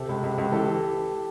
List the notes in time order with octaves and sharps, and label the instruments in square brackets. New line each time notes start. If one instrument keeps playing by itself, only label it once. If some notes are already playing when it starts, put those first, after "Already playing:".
Already playing: [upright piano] C3 [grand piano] G4 A4
[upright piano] C#2
C#2
C#2
[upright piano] E3 [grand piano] G4 A4
[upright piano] E3